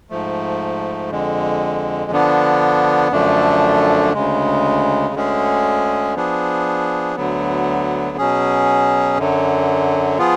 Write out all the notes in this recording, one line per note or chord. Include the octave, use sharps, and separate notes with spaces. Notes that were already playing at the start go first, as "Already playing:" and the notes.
G#2 F3 A3
F2 D3 G#3
D3 F3 B3 D4
F#2 D3 F3 A3 D4
D2 C#3 G#3
D2 D3 G#3 C#4 G#4
F3 B3 D4 G#4
D2 D3 F#3 B3
B2 F#3 C#4 G#4
F#2 D3 F#3
F3 B3 F4 G#4